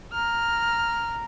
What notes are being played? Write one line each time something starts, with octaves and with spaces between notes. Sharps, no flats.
A#5 F6